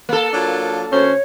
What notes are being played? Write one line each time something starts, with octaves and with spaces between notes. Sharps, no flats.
A#3 A4
F#3 D4 F4
D2 C#4 C5 C#5